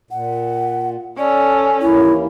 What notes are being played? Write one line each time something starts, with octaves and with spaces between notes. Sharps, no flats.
A#2 F#5
C#4 A4 D5
D#2 E3 A#3 E4 C#5